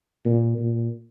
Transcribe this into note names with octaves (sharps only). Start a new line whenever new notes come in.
A#2
A#2